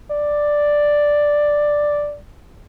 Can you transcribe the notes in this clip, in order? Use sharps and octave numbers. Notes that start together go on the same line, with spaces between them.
D5